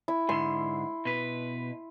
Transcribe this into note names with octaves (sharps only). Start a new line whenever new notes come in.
E4
G#2 D3 C6
B2 B4